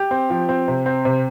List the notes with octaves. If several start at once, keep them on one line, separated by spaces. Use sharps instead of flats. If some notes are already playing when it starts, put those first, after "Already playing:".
Already playing: G4
C4
F3
C4
C3
C4
C3